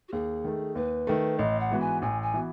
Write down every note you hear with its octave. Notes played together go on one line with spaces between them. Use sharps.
F#4
D#2 G#4
D#3 A3
D#2 B4
D#3 A3
A1 D#5
F#5
G#2 E3 B3 F#4
G#5
A1 G#5
G#5
E3 B3 F#4